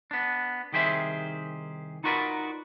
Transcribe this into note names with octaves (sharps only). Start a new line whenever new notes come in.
B3 D4
C2 D#3 G4 G#4 C5 E5
D#4 F4 F#4 A#4 B4 D5